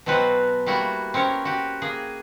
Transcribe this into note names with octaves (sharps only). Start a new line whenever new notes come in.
B2 F#3 C4 F#4 B4 F5
G3 A3 A#3 E4 F#4
C4 C#4 A#4 C#5
F#4 G4
A#3 G#4